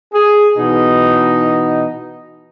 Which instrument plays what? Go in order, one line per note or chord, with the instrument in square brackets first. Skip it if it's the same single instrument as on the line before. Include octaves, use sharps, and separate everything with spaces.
[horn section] G#4
B2 E3 D#4